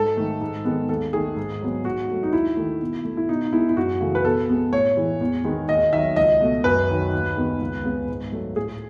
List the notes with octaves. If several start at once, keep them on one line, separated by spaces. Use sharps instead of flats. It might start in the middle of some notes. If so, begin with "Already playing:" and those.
Already playing: G#2 A4
D#3 A3
G#2
D#3 G#3 B3
D#2 A4
D#3 A3 G#4
G#2
F#3 B3
G#2 F#4
F#3 A3
D#4
D#2 E4
D#3 A3
B2
A3
E4
B2 D#4
G#3 B3 E4
E4
F#2 F#4
C#3 E3 A3
B4
B2 A4
G#3 B3
A2 C#5
E3 G#3
E2
D#3 G#3 B3
D#2 D#5
D#3 F#3 E5
C#2 D#5
B2 A3
F#2 B4
D#3 F#3
D#2
D#3 G#3 B3
C#2
C#3 G#3 B3
G#2
F#3 A3
A2 G#4